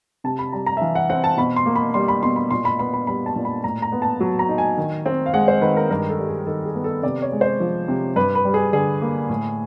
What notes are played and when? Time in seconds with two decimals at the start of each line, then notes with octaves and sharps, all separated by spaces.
0.24 C3 A5
0.39 B5
0.53 G3 A#5
0.66 A#5
0.77 E5
0.81 E3 F5
0.95 F#5
1.09 C4 F#5
1.24 A5
1.37 B2 B5
1.56 C6
1.66 A#3
1.76 B5
1.94 G3 C6
2.08 B5
2.23 B2 C6
2.36 B5
2.51 A#2 C6
2.65 B5
2.79 B3 B5
2.94 B5
3.07 G3 B5
3.26 A5
3.36 A#2
3.45 B5
3.64 A2 A#5
3.82 A#5
3.92 B3
4.02 A5
4.20 F#3
4.39 A#5
4.49 D#4
4.58 G#5
4.77 D#3
5.06 C4
5.26 F5
5.34 G#3 F#5
5.48 C5
5.62 D#3 B4
5.77 A#4
5.90 G2 A#4
6.09 A4
6.19 G3
6.28 G#4
6.46 D#3 A4
6.66 G#4
6.75 B3
6.84 A4
7.03 C3 D5
7.22 C#5
7.32 G#3
7.41 C5
7.60 F3
7.88 C3
8.16 G2 B4
8.35 B4
8.45 G3
8.54 G#4
8.73 D3 G#4
9.02 A#3
9.30 A2